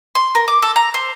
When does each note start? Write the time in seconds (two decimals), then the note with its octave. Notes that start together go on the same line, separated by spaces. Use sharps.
0.15 C6
0.35 A#4
0.48 D6
0.62 A4
0.76 A#5
0.94 C5